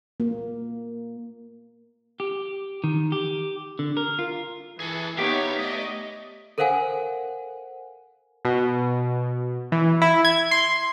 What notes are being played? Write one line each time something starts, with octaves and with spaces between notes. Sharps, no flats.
A#3
G4
D#3
G4
D3
A#4
F4
E3 G#4 A4
B3 D#4 G4 C#5 E5 F5
A3 D5 D#5
A4 A#4 C5 F5 F#5 G#5
B2
E3
E4
G#6
C6